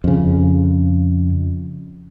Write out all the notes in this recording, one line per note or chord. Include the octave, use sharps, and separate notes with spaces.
F2 C#3